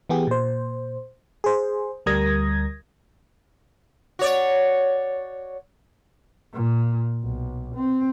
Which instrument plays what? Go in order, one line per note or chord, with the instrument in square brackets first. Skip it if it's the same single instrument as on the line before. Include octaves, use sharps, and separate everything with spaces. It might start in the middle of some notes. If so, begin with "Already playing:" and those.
[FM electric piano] E3 B3 G4 G#4
A#2 C5
G#4 C5
D2 G3 A#4 D#6 G#6 A#6
[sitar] F#4 C#5 D5
[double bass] A#2
B1
C4